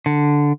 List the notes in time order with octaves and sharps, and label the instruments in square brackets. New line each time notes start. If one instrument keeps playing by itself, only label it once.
[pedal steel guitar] D3